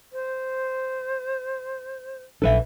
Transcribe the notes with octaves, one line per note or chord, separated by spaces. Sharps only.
C5
A#1 F#3 D4 A4 B4 E5